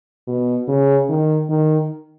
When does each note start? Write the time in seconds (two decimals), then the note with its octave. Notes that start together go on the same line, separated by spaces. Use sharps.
0.27 B2
0.68 C#3
1.09 D#3
1.50 D#3